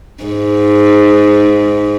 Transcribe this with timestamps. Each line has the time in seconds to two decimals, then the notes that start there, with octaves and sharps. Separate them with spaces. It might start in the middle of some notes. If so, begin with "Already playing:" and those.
0.24 G#2